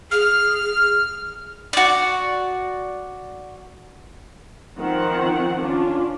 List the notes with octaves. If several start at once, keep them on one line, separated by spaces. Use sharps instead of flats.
G#4 F6
F#4 D5
D#3 F3 C4 F#5
C#4 D4 F4